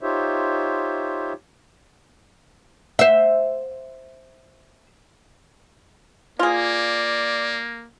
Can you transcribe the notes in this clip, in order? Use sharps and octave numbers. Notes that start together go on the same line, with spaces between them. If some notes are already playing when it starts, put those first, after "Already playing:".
D#4 F4 G4 C5 C#5 E5
C5 E5
A#3 F4 G#4 D5